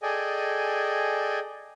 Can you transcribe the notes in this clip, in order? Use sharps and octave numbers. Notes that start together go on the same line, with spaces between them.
G#4 A4 D5 D#5 G5 G#5